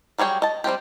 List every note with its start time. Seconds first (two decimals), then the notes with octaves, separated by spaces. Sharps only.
0.18 F#3 G3 G#4 C#5 G5
0.42 D#5 A5
0.64 G3 C4 F4 G4